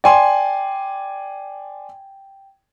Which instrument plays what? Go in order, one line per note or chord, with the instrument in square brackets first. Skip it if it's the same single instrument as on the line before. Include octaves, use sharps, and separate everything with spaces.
[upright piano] D5 G#5 C6 [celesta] G5